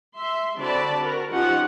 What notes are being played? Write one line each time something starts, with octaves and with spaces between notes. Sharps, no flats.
E5 C6
D3 C4 F#4 D5 A5 B5
F#4 A#4
F3 C#4 D#4 G4 F#5